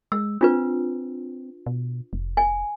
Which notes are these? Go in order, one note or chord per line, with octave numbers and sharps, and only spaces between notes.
G#3 E6
C4 D4 F4 B4
B2
F1
G#5